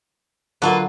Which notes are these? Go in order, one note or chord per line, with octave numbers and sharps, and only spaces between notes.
D3 F#3 A#3 F4 B4